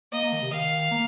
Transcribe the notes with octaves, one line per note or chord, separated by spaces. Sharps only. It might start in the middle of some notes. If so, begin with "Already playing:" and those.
A#3 D#5
A#3
D#3
C3
D#3 F5
A#3